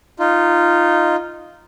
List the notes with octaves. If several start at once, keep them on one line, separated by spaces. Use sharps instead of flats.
D#4 F4